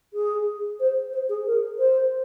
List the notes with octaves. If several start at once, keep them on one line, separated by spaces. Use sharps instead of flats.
G#4
C5
C5
G#4
A#4
C5